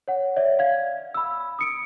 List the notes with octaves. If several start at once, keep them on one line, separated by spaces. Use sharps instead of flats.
C#5 F#5
C#5 D5 E5
F5 G#6
B5 E6
D#6 C#7 D7